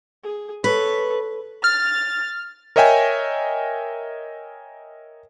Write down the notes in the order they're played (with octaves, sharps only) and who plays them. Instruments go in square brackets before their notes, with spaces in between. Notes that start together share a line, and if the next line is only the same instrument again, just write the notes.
[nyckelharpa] G#4
[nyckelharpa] A4 C#5 [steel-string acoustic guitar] B4
[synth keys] F6 [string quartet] A6
[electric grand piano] A#4 C#5 D#5 E5 G5 G#5